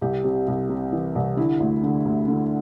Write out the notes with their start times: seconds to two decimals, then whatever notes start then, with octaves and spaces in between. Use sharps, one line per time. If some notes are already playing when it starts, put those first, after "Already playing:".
0.01 C2 G4
0.24 C3
0.47 C2
0.69 C3
0.92 E3
1.15 C2
1.37 D3 E4
1.60 D2
1.83 D3
2.05 D2
2.28 D3